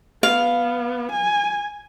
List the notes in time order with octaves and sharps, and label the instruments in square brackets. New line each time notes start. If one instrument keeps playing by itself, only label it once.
[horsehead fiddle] B3 [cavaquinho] F5
[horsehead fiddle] G#5